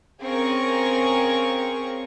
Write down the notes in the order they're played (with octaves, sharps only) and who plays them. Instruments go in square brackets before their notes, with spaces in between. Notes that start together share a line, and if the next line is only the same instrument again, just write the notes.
[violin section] C4 C#4 G#4 A#4 F5 C#6